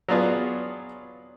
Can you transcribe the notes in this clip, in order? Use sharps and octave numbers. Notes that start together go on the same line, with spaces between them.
F#3 B3 D4 F4 G#4